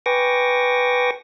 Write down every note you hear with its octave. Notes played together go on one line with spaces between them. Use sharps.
B4 G5 G#5 C#6 D6 A#6